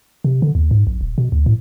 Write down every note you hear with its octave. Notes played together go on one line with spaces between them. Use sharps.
C3
D3
D#2
G#2
B1
D#1
B2
D2
A2